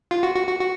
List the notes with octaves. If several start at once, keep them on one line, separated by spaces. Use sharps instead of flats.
F4
F#4
F#4
F#4
F#4